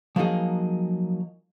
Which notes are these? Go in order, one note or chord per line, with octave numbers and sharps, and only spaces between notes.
F3 F#3 A#3 D#4 G#4